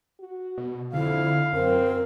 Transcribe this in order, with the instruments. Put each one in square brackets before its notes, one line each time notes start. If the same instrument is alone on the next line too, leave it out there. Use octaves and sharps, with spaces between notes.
[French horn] F#4
[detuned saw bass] B2
[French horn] F2 [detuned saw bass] D3 [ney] E4 [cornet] F5
[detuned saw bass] F#2 [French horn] C4 [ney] A#4